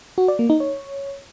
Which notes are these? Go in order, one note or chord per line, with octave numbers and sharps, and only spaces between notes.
F#4
D5
A#3
D#4
C#5